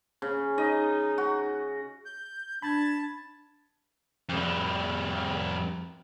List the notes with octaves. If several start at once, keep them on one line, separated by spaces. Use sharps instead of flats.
C#3
D#4 D#5
F#4
G6
D4 A5 B5 G#6
F2 G3